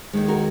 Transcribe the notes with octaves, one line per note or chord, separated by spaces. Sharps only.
D#2 D#3 G#3
F#4 A#4